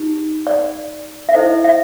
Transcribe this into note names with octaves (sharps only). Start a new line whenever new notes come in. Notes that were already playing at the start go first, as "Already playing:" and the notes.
Already playing: D#4 G4
D5
E5
E4 A4 C5 D#5
E5